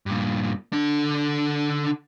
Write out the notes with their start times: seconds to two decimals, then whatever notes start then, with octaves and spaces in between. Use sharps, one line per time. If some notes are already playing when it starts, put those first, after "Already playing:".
0.06 G2 A#2
0.73 D3 D4